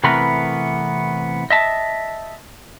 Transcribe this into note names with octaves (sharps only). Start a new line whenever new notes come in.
C3 E3 A3 B3 A#4 B4
D#5 E5 A5